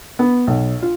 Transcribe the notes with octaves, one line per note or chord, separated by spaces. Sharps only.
B3
B1
F4